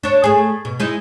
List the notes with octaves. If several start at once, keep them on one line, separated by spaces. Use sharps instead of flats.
D4 C#5
A3 G#4
B2
G#3 D#4 E4